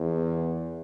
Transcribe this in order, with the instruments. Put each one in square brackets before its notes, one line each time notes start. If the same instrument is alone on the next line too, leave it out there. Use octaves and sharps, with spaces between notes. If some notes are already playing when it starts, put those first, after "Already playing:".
Already playing: [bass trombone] E2